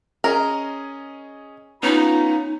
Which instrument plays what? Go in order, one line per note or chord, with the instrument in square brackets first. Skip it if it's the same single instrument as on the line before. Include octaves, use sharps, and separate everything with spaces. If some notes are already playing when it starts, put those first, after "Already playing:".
[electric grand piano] C#4 G#4 D#5 [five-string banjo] A#4
[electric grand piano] B3 C#4 [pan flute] D#4 [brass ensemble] F4 A#5